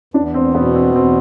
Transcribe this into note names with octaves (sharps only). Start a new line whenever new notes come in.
E2 D4
C4
B2 B3
C4
E2 C4